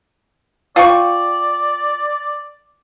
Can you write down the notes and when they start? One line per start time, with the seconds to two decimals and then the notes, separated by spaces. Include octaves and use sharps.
0.76 F4 D5 G5 C#6